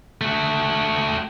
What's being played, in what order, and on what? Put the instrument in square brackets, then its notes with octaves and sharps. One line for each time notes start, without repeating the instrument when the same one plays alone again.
[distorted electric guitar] A3 F#4